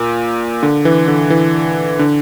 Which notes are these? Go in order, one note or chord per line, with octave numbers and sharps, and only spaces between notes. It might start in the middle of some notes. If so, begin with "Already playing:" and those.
Already playing: A#2
D3
E3
D3
E3
D3